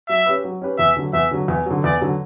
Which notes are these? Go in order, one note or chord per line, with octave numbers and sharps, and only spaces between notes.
F#3 E5
C#4 G4 B4
F#3
C#4 G4 B4
E2 E5
D3 F#3
E2 E5
D3 F#3
E2
D3 F#3
E2 D5
D3 F#3